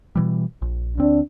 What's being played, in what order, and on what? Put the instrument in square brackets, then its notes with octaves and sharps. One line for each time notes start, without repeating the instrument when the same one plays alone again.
[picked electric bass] B2 E3 G3
A#1
[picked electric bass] D2 C4 [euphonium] D4